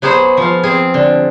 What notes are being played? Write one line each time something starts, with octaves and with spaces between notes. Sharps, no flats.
F#3 B3 G#4 C5 F#5
F3 F5
C4 G#4
D3